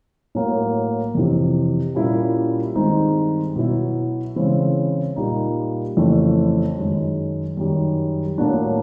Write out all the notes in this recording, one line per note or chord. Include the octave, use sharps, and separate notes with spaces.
A2 F#3 A#3
F2 C3 E3
A#2 G3 A#3 C#4 E4
G2 D#3 G#3 C4 D#4
B2 F#3 B3 E4
C#3 E3 G#3 C4 E4
A#2 G3 A#3 D#4
F2 C#3 E3 A3
F#2 D#3 G#3
F#2 D#3 G3
A2 F#3 A#3 D4